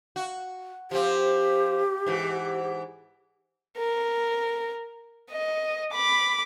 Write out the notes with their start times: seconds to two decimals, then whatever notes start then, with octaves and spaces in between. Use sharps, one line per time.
0.16 F#4
0.91 F3 C4 G4
2.07 G#2 E3
3.77 A#4
5.30 D#5
5.94 B5 D6